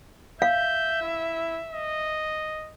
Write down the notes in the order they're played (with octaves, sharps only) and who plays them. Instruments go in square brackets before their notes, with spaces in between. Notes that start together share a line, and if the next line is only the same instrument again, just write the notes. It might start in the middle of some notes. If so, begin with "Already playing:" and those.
[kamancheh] E5 [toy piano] F5 [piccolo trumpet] G6
[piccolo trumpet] E4
D#5